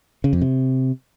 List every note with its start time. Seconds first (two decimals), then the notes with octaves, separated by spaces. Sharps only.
0.24 C#3
0.33 F2
0.41 C3